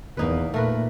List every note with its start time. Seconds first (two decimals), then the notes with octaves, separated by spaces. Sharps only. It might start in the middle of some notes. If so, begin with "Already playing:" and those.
0.17 E2 A#3 D#4 B4
0.54 A#2 A3 A#4 B4